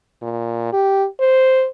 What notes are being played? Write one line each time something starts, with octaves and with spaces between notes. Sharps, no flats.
A#2
G4
C5